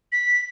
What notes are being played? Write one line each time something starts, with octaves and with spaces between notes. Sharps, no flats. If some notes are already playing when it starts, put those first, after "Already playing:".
B6